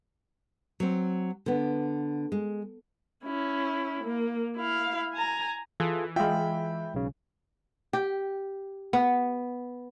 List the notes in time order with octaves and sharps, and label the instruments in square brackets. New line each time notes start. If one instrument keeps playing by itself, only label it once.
[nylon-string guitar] F#3 C4
D3 B3
G#3
[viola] C#4 E4
A#3
E4 F5
G#5 A#5
[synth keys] E3 [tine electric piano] F4 G#4 A4
[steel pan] G#3 F4 [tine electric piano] E5 B5 [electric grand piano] G5
[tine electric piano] B1 C#3
[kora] G4
B3